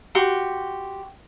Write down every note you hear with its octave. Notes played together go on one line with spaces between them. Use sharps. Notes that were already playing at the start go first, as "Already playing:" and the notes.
F#4 G4 C6